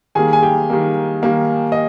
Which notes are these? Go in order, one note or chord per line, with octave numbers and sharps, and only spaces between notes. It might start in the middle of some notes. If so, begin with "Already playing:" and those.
D#3 G3 A#3 G#4 G#5
G#5
G4 G5
D#3 G3 A#3
D#3 G3 A#3
D#5